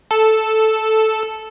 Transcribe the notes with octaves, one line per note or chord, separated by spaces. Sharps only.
A4